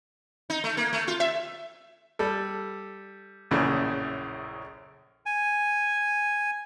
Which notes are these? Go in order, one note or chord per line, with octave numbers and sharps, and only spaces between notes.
D#4
A3
A#3
A3
F4
E5
G3 A4
A#1 F#2 A2 C#3 E3
G#5